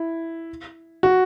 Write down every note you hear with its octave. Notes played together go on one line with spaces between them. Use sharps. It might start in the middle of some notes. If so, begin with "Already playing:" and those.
Already playing: E4
F#4